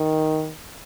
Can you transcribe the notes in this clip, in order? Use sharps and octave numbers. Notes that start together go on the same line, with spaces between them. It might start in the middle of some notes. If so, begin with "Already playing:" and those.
Already playing: D#3